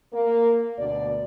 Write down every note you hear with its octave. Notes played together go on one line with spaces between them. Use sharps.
A#3
D2 B2 D5